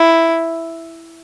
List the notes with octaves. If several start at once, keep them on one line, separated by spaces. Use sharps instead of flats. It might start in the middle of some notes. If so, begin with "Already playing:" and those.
Already playing: E4